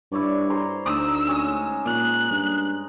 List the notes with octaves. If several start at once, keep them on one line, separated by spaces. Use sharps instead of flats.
G2 E4 C#5 D5
C5 A#5 C6
D2 D#4 E6
G#3 C#4
A#2 F#6
G2